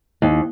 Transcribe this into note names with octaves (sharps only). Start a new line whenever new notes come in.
D#2